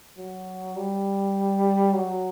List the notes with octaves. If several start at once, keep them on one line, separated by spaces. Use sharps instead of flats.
F#3
G3
F#3